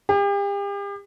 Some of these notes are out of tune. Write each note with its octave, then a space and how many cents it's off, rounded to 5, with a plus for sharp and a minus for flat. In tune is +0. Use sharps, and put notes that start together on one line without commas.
G4 +40